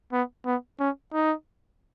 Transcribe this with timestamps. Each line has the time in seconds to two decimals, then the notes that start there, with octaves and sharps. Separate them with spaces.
0.13 B3
0.46 B3
0.80 C#4
1.13 D#4